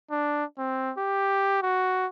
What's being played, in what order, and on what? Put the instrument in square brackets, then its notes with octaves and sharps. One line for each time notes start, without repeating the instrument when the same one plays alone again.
[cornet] D4
C4
G4
F#4